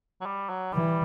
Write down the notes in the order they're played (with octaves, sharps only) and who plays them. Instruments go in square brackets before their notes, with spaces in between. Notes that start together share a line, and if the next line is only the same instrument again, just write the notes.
[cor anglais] F#3
G3
F#3
[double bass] E3 [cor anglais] G3